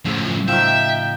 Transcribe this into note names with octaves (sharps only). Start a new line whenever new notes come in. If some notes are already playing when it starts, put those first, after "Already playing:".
F#2 A2 C#3 F3 E6
D#3 F3 E5 G5